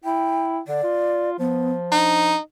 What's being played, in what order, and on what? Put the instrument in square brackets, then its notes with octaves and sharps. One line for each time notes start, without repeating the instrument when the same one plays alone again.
[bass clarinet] E4 [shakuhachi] G5
[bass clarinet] D3 [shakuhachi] D5
[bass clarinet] F4
[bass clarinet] F3 [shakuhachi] B3
[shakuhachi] D4 [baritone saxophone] D#4